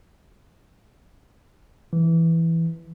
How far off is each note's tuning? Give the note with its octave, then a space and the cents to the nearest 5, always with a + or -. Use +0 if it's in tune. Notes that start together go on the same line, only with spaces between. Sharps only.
E3 +0